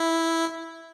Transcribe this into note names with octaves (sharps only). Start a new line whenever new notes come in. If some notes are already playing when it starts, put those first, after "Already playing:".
Already playing: E4